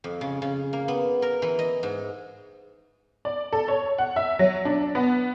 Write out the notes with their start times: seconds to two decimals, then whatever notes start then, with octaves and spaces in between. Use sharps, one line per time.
0.04 F2
0.21 C#3
0.42 C#3
0.73 A#3
0.88 B3
1.22 A#4
1.42 E3
1.59 D#5
1.83 G#2
3.25 D5
3.53 A4
3.68 C#5
3.98 F#5
4.16 E5
4.39 F#3
4.65 D4
4.95 B3